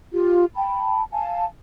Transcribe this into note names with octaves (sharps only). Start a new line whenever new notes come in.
F4 G4
G5 A5 B5
F5 G#5 A5